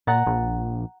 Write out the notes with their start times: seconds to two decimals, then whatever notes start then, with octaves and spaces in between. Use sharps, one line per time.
0.07 A#2 F#5 A#5 A6
0.27 A#1